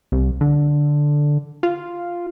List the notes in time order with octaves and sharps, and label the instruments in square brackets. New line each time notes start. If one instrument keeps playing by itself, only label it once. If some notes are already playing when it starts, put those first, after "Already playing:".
[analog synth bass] C2
D3
F4